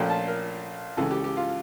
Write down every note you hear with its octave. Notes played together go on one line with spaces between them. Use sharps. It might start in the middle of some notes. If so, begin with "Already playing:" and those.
Already playing: A#1 A#2 F3 A3 C#4 G5
A5
A#4
C#2 C#3 E3 A4
G4
G4
F4